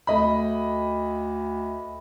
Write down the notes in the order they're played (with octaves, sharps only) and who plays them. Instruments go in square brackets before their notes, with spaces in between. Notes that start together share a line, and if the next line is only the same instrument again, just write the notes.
[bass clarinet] D2 [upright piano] A3 D#5 B5